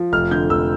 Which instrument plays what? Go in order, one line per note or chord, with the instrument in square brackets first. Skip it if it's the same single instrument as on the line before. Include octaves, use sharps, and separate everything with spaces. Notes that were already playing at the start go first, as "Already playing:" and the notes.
Already playing: [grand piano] F3
F1 F6
D3 G6
F1 E6